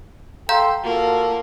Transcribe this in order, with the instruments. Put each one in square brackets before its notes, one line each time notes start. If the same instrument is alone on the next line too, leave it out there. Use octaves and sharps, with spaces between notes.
[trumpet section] A4 G5 C6 [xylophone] F5 A#5 G6
[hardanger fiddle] A#3 [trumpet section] F4 F#4 A4